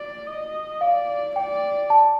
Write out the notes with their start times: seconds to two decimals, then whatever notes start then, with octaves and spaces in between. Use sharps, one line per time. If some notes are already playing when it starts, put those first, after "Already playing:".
Already playing: D5
0.27 D#5
0.81 D5 F5
1.36 D5 G5
1.90 A5